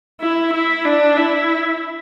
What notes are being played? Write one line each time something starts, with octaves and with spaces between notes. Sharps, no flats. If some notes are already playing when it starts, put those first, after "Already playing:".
E4
E4
D4
E4